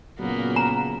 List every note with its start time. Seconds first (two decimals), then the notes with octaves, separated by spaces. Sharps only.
0.19 A#2 C#3 F#3 A#3 B3
0.56 A#5